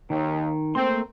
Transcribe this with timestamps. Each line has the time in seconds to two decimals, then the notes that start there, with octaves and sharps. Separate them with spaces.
0.10 D#2 D#3
0.75 A3 A#3 C4 C6